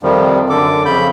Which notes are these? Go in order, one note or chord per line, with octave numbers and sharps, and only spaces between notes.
F2 C3 D#3 F3 G3
F#2 D3 A4 D6
F2 C#3 B5 G6